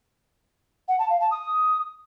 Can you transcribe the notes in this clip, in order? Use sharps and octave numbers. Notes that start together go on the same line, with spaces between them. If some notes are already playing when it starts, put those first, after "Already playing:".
F#5
A5
F5
A5
D#6